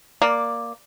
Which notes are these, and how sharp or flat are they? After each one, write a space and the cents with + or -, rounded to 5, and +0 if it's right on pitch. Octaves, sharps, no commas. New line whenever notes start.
A#3 +0 D5 +0